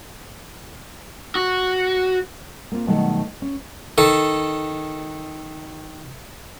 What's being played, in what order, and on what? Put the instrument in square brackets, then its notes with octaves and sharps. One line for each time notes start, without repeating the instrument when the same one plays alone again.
[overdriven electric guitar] F#4
[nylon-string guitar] A#3 C4 F4
B2 D#3 F#3 G3 A3
C#4
[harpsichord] D#3 A4